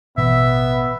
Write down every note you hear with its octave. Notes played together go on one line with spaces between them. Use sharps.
A1 B2 E3 B3 E5